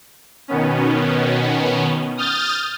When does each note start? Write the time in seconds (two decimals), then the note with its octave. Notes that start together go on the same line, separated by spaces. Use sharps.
0.48 B2 D#3 B3 C#4
2.17 D#6 F6 G6 A6